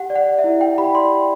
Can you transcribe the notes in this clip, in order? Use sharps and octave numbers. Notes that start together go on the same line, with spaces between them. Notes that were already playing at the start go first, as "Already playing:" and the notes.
Already playing: G4 F#5
D5
F#5
D5
E5
E4
E4 G5
G4 B5
D5 C6
G4